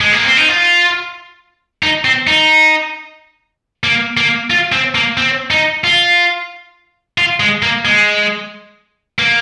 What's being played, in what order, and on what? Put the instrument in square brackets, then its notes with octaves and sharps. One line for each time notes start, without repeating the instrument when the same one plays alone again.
[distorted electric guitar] G#3
A#3
C4
D#4
F4
D#4
C4
D#4
A#3
A#3
F4
C4
A#3
C4
D#4
F4
F4
G#3
A#3
G#3
A#3